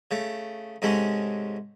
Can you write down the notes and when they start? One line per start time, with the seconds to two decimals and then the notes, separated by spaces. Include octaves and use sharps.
0.11 C#3 A3
0.82 G#2 C3 G#3 A3 C#4